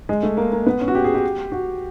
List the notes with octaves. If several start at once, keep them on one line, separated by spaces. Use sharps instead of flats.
G#3
A3
A#3
A#3
B3
C#4
F#4
G4
G#4
G4
F#4